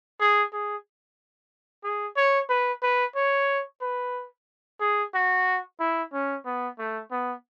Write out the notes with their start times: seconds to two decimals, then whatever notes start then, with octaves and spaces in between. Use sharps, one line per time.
0.20 G#4
0.53 G#4
1.84 G#4
2.16 C#5
2.49 B4
2.82 B4
3.16 C#5
3.81 B4
4.80 G#4
5.14 F#4
5.80 E4
6.13 C#4
6.45 B3
6.79 A3
7.11 B3